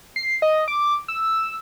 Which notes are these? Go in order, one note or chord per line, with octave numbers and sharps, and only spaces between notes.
C7
D#5
D6
E6